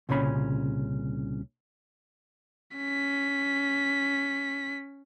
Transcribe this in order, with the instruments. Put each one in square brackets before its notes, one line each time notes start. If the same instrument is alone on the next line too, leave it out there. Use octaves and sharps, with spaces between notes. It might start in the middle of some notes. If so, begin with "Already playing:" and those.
[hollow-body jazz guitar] C2 A#2 C#3 C#4 B5
[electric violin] C#4 B6